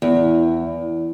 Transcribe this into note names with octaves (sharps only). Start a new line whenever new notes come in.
E2